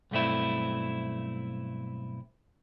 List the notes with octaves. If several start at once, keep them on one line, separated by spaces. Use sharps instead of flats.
B1 G2 A3 C4 E4